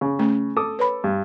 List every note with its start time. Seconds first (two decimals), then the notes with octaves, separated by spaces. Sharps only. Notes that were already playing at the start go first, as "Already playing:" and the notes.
0.01 C#3
0.19 A3 C#4
0.57 A4 D6 D#6
0.79 B4 C#5 B5
1.04 G2